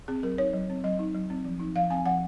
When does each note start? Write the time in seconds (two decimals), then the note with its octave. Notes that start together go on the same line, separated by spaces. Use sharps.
0.08 C4 G#4
0.23 F#3 A#4
0.38 D#4 C#5
0.53 F#3
0.69 C4
0.84 F#3 D#5
0.99 D#4
1.14 F#3
1.30 C4
1.45 F3
1.60 D#4
1.75 F3 F5
1.90 C4 G#5
2.06 F3 F#5